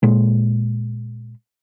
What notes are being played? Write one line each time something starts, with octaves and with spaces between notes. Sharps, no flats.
A#2 G#3